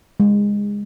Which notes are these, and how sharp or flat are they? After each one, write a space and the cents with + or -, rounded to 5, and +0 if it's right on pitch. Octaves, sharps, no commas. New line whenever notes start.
G#3 -20